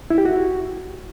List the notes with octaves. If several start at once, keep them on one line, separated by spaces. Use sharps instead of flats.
E4
G4
F#4